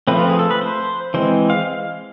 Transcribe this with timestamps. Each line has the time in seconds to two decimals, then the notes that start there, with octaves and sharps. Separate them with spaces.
0.07 F3 A3 C4 B4
0.18 F4
0.30 G#4
0.39 A4
0.51 B4
0.61 C5
1.14 E3 G#3 C4 C5
1.50 F5